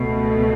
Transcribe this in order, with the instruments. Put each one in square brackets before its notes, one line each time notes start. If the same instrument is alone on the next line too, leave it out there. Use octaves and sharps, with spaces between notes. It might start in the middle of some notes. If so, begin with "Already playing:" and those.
Already playing: [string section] C#2 B2 A3